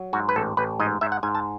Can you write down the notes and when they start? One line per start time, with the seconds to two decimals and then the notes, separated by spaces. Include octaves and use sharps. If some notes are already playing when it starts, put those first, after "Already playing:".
Already playing: F#3
0.13 G#2 F#4
0.29 B4
0.36 A1 A4
0.57 A1 B4
0.80 G#2 D#5
1.01 G#2 E5
1.12 F#5
1.23 G#2 G#5
1.35 A5